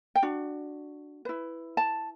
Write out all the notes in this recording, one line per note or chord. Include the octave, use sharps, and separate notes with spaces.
G5
D4 F#4
E4 B4
A5